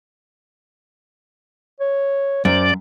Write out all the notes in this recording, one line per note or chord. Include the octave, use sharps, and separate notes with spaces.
C#5
F#2 C5 D5